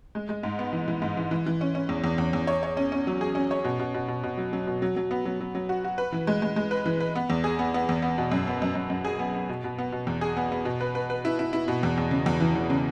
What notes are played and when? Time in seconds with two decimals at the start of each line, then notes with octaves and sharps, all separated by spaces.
0.15 G#3
0.29 G#3
0.43 G#2
0.59 B3
0.73 E3
0.88 E3
1.02 G#2
1.17 E3
1.31 E3
1.46 E3
1.61 C#4
1.75 C#4
1.89 E2
2.04 E2
2.18 E2
2.33 E2
2.47 C#5
2.63 C#5
2.77 C#4
2.92 C#4
3.07 F#3
3.21 G#4
3.35 C#4
3.51 C#5
3.64 B2
3.79 B2
3.94 B2
4.08 B2
4.23 B2
4.38 F#3
4.53 F#3
4.67 B2
4.82 F#3
4.96 F#3
5.11 B3
5.25 F#3
5.40 F#3
5.55 F#3
5.69 F#4
5.84 F#4
5.98 B4
6.12 E3
6.27 G#3
6.42 G#3
6.56 G#3
6.71 B4
6.86 E3
7.00 B4
7.15 B3
7.30 E2
7.44 G#4
7.59 B3
7.74 B3
7.89 E2
8.02 B3
8.18 B2
8.32 F#2
8.47 B3
8.62 F#2
8.75 F#2
8.90 F#2
9.05 G#4
9.19 B3
9.35 B3
9.49 B2
9.64 B2
9.78 B3
9.92 B2
10.07 E2
10.21 G#4
10.37 B3
10.52 B3
10.65 B2
10.81 B4
10.95 B4
11.10 B4
11.25 E4
11.39 E4
11.53 E4
11.68 B2
11.83 E2
11.98 E2
12.11 C#3
12.26 E2
12.40 E3
12.55 E3
12.70 C#3